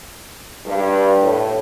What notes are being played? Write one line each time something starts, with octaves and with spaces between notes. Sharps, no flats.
G2
A2